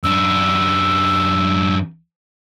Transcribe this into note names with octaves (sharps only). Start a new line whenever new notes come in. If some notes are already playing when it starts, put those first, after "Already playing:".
F#2 D4 E6